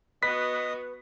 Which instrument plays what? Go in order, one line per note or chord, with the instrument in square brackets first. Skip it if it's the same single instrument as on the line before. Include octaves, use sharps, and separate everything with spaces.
[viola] B3 F#4 [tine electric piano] B4 [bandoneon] D#5 D#6 [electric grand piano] B6